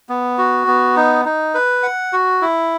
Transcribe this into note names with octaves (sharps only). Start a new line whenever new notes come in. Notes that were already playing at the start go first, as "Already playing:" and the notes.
B3
F#4
B3
D#4
D#4
B4
F#5
F#4
E4